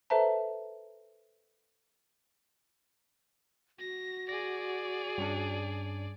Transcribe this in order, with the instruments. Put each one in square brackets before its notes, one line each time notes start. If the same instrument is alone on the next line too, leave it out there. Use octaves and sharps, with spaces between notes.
[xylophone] A4 B4 C5 E5 A5 A#5
[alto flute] F#4 [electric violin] A#6
[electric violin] G#4 D5 [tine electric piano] A#6
[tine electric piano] G2 C#4 D4